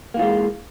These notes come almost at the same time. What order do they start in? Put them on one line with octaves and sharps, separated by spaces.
A#3 E3 F4 G#3